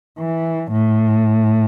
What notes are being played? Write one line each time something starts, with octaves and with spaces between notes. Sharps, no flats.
E3
A2